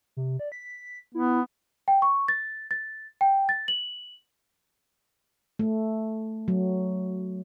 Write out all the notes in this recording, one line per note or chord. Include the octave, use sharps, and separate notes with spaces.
C3
D5
B6
B3 E4
G5
C#6
A6
A6
G5
A6
F#7
A3
F#3